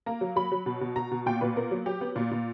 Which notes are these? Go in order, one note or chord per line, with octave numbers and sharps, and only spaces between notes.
A#3 A#5
F#3
F#3 B5
F#3
B2
B2
B2 A#5
B2
A#2 G5
A#2 B4
B3 A#4
F#3
F#3 G4
B3
A#2
A#2